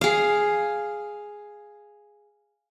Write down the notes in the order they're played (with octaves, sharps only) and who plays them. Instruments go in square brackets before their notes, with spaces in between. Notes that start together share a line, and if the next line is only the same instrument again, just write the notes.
[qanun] G#4 F5